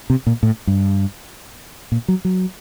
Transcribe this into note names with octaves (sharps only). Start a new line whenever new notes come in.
C3
A#2
A2
G2
A#2
F#3
F#3